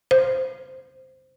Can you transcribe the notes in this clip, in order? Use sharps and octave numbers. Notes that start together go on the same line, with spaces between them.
C5